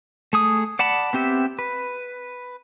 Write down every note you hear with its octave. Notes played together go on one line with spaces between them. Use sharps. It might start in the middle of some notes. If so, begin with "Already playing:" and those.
A3 G#4 D#6
D5 F#5 A5 B5
B3 C4 G4 E5
B4